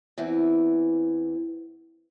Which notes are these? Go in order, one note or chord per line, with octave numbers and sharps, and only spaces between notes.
E2 E3 C4